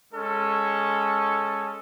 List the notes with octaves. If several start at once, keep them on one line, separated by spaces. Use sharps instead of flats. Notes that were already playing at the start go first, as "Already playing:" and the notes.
G#3 C#4 A4